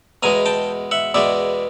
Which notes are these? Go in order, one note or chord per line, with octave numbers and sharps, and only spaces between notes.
E2 B2 G#3 G#5 A#5
G5 A5
E5 F#5
E2 B2 G#3 D5 E5